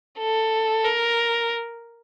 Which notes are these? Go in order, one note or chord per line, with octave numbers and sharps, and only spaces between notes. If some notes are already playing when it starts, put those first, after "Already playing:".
A4
A#4